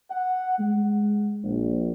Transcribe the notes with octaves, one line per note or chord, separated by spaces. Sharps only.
F#5
G#3
A#1